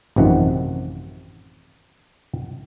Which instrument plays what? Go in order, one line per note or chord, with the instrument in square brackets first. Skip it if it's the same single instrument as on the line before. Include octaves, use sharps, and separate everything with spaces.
[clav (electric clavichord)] A1 F#2 C3 D#3 F3 F#5